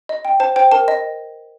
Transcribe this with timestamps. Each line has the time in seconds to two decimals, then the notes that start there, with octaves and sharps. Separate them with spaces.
0.09 D#5
0.25 G5
0.40 C5 A5
0.56 C5 G5
0.72 A#4 A5
0.88 D#5